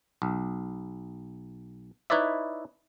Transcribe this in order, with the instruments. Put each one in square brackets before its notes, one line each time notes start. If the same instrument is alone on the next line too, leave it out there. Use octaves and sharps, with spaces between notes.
[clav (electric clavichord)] B1
D#4 E4 B4 C#5 D5 E5